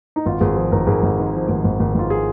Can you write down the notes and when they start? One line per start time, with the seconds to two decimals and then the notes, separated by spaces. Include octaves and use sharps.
0.16 D#4
0.26 G#1 F4
0.41 G#1 G#4
0.56 F3 G#4
0.72 G#1 A#4
0.87 G#1 G#4
1.03 G#1
1.19 G#2
1.34 F3
1.49 G#1
1.64 G#1
1.80 G#1
1.95 G#1 F4
2.10 G#4